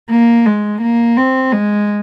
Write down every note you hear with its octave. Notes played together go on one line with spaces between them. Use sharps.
A#3
G#3
A#3
C4
G#3